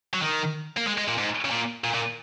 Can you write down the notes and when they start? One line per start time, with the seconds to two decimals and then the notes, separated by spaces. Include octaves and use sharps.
0.14 F#3
0.22 D#3
0.77 A#3
0.87 G#3
0.98 G#3
1.08 A#2
1.18 G#2
1.45 C#3
1.51 A#2
1.84 A#2
1.94 A#2